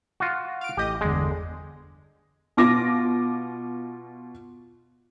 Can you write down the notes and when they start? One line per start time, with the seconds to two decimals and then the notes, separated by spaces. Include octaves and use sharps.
0.20 F4 F#4
0.61 F5 D7
0.77 A1 G4 D#5
1.01 G1 E2 D3 G#3
2.57 B2 F4 D6 A#6